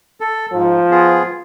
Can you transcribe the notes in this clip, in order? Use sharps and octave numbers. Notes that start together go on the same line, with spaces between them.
A4
G#2 F3
B3 F4 G#4